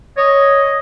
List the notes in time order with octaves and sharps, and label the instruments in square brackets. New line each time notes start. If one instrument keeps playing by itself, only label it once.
[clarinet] C#5 [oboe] D#5